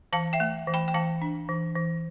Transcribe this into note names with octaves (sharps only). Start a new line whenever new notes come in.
E3 F5 A5
E5 G5
A3
E3
G5 B5
G5
E3 F5 A5
D4
E3
E3